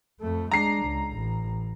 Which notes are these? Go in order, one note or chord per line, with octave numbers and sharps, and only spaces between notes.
F2 A3
G#3 D4 A#5 C7
C#2
A1